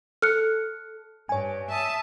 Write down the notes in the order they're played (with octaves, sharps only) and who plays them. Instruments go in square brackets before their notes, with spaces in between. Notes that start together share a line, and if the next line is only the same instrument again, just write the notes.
[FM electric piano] A4 [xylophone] F6 F#6 C#7
[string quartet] G2 [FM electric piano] C#5 G#5
[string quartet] E5 A5 D#6